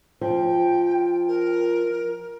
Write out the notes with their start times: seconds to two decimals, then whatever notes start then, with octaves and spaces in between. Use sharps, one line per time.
0.21 F3 G5
1.28 A#4